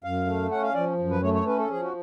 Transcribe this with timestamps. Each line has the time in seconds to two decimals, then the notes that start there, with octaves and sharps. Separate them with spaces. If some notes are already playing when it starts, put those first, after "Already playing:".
0.04 F#2 F5
0.27 A3
0.51 C#4 F#5
0.63 F5
0.74 F3 D5
0.99 F#2
1.10 B4
1.23 A3 C#5
1.34 C#5
1.46 C#4 B4
1.58 A4
1.70 F3 G#4
1.82 F#4